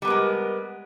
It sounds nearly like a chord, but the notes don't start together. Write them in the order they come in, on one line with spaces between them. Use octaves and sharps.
G3 B3 A#4 G#3